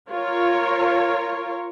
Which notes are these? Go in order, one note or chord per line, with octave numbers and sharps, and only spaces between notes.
F4 A#4 C#5